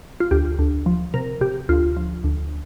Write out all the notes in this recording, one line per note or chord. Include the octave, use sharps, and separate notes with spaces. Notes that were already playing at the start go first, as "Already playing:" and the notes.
F4
D2 G4
D2
F3
C3 A#4
C3 G4
D2 F4
F3
D2